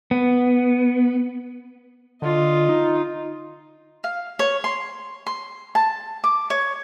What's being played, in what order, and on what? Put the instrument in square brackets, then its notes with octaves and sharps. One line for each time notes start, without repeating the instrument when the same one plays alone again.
[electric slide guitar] B3
[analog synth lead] D3 [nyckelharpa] F4 D#5
[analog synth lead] D#4
[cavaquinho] F5
C#5
C6
C6
A5
D6
C#5